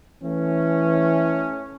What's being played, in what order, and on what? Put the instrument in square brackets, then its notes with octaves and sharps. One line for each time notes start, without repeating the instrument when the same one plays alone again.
[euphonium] E3 [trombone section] A3 C#4